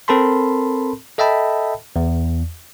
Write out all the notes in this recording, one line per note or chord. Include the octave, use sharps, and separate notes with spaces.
C4 A4 A#4 A5 B5 C6
A4 D#5 E5 G5 A5 B5
E2